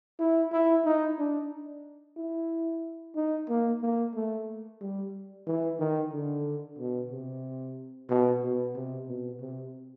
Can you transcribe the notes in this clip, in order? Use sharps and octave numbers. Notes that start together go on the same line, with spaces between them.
E4
E4
D#4
D4
E4
D#4
A#3
A#3
A3
G3
E3
D#3
D3
B2
C3
B2
B2
C3
B2
C3